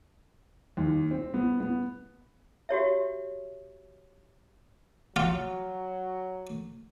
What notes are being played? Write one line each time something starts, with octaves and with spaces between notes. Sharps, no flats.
D#2
C4
B3
B3
F#4 G4 C#5 E5
F#3 F4